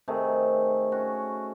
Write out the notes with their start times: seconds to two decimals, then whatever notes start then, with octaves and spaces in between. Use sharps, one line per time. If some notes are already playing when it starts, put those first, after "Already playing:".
0.08 C3 D#3 A3 G#4
0.92 C#4 F#4